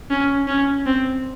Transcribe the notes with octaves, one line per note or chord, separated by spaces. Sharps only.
C#4
C#4
C4